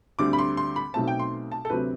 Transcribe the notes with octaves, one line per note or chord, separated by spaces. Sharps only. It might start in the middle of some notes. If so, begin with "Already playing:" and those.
D2 D3 G3 C4 D6
B5
C6
C6
B5
B1 B2 A3 C4 A5
G5
C6
A5
A4
D2 C3 F#3 C4 B4